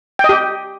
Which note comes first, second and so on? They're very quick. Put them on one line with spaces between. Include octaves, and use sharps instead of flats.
G5 D#5 G4